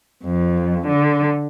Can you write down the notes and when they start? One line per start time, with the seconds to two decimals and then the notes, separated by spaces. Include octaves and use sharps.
0.25 F2
0.87 D3